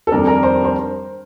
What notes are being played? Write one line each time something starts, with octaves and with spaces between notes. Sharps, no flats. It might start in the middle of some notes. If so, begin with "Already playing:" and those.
A4
F2 D#3 G3 D4 A#4
A#4
C5
C5